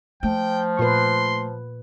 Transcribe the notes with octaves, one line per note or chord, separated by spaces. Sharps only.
F3 A3 G5
A#2 B4 C6